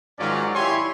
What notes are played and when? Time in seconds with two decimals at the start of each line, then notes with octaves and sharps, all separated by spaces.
0.19 G#2 D#3 F#3 C#4 F4 D5
0.55 E4 G4 C#5 G#5 C6